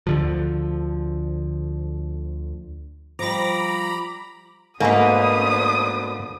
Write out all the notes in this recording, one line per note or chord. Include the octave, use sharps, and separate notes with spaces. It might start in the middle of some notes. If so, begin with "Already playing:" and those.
D2 D3 F3
F3 G3 A#5 B5 D6 A#6
G#2 B2 A3 A#3 D4 B4 C5 D#6